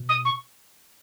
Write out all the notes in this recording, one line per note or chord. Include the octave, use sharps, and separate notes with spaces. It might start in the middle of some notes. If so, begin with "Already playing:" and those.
Already playing: B2
D#6
C#6